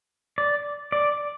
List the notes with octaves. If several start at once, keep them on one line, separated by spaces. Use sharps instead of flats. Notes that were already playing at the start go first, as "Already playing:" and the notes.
D5
D5